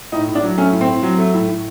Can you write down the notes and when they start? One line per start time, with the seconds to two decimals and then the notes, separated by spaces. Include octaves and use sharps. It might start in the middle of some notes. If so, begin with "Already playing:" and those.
0.12 A2 D#4
0.28 A2
0.35 D4
0.43 F#3
0.58 A3 C#4
0.72 A2
0.81 C4
0.88 A2
1.03 F#3
1.18 A3
1.34 A2
1.48 A2